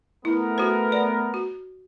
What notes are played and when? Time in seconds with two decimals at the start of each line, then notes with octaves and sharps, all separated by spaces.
0.25 A3 B3 E4 A#4
0.58 F#4 C5
0.92 D5
1.34 F#4